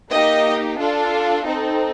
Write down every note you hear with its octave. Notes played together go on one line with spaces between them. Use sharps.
A#3 D#4 G4 D#5
D4 F4 A4
C4 D#4 A4